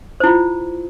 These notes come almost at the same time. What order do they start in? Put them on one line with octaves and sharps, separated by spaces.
C5 E4 F4